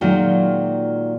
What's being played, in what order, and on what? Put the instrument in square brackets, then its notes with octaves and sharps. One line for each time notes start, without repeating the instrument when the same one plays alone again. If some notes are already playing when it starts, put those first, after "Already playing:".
[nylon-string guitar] A#2 D#3 F#3 G#3 F4 F#4